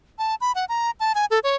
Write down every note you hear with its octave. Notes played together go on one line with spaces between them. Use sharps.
A5
B5
F#5
A#5
A5
G#5
A4
C#5